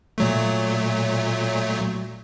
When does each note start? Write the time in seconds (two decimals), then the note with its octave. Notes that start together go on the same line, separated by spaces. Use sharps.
0.18 A#2 F#3 A3